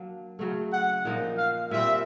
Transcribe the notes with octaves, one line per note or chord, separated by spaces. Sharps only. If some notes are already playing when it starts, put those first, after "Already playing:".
Already playing: F#3 A#3 D4
C#3 F#3 A3 C#4
F#5
A#2 F3 A#3 D#4
F5
A#2 G3 C4 E5